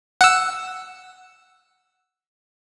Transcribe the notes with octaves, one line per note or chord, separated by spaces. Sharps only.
F#5 E6